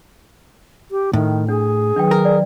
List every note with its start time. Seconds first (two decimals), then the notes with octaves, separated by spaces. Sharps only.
0.91 G4
1.13 A2 D#3
1.49 D4 G#4
1.96 D#3 F#3 D4 B4 G5
2.11 A#4
2.25 D5